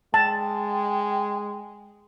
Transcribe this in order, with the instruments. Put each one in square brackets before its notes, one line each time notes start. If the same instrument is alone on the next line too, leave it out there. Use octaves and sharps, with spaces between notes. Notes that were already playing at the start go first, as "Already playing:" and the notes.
[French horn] G#3 [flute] G5 [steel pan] A5